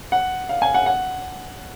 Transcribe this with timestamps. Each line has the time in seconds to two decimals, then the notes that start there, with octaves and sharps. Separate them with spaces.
0.12 F#5
0.49 F5
0.62 G#5
0.74 F#5
0.86 F#5